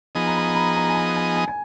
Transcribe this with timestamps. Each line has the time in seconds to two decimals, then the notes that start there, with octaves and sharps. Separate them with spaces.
0.15 F3 B3 D#4 G#4 D#5 G#5
0.27 A#5
0.36 B5
0.48 B5
0.55 A#5
0.76 A#5
0.88 G#5
0.96 A#5
1.16 G#5
1.36 G#5
1.48 G#5